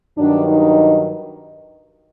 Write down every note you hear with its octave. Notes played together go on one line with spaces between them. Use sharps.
G2 D#3 F#3 D4
D#4